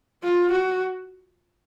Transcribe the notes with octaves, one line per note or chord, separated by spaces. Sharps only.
F4
F#4